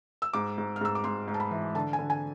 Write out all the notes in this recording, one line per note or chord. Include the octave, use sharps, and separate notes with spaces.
E6
G#2 D6
G#2
F6
G#2 E6
D6
G#2 C6
G#2
A5
B5
E3
D3 A5
G#5
D3
G#5